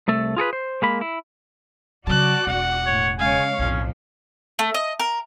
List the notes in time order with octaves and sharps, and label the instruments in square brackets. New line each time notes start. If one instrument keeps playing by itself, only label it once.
[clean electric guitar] C2 A3 A4
F4 G#4 A4 B4
C5
G#3 A#3 B5
E4
[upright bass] C#3 F#3 [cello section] F#4 D5 [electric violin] A5 F#6
[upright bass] E1 [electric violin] F#5
[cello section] A2 [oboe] C#5
[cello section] C#3 G#3 C#5 [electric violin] F5 [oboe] G#5
[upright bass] B1 A2 [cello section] F2 F3 [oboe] C#4
[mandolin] A3
D#5
A#4